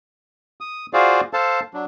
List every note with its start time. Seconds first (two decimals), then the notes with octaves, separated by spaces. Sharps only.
0.61 D#6
0.93 F4 F#4 G#4 C5 D5 F5
1.33 A4 C5 F5 A5
1.74 F#3 D4